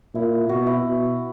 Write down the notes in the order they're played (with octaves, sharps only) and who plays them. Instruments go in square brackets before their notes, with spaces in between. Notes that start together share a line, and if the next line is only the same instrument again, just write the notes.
[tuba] A#2 [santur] E4
[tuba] B2 [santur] F#4
[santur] E4
[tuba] B2